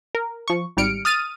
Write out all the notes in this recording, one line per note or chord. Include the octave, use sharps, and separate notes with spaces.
A#4
F3 C#6
G#1 G#2 G3 F6 C#7 D7
D#6 F6 A6 D#7